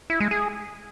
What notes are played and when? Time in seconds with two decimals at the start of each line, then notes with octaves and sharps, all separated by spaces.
0.10 E4
0.20 G#3
0.31 G#4